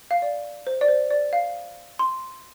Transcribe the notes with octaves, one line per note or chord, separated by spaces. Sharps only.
F5
D5
C5
D5
C5
D5
F5
C6